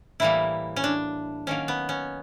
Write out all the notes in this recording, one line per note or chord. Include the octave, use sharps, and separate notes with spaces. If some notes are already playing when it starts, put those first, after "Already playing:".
A2 E3 G3 A#3 E4
C#4
D4
D#3 F#3 A#3 C#4
B3
C#4